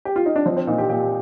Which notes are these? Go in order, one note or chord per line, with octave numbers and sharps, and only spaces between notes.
G4
F4
D#4
D4
F3 C4
C4
A#2 D#4
G4
A#2 G4